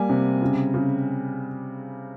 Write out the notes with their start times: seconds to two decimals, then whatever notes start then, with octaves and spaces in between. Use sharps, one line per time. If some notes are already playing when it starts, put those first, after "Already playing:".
Already playing: G3 A#3 G#5
0.09 C3
0.42 C#3
0.74 C#3